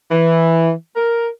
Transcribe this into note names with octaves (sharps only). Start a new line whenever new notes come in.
E3
A#4